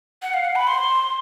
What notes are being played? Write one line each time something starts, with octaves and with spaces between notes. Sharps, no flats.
F#5
F5
F#5
B5
C6